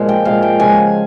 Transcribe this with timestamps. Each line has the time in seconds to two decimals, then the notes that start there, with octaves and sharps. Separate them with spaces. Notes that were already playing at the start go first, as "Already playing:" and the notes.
Already playing: A#2 F3 G#3
0.09 G5
0.25 A#2 F3 G#3 F5
0.43 G5
0.60 C#3 F3 G#3 G#5